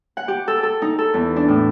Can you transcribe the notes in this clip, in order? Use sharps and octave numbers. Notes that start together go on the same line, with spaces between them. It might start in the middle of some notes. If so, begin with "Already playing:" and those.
F#5
G4
A4
A4
D#4
A4
E2
D4
A2